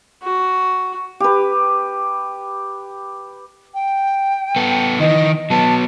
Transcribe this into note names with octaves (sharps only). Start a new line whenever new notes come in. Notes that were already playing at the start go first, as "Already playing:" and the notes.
F#4
G4 B4
G5
B3 A4
D#3 E3 D#5
F#3 B3 A5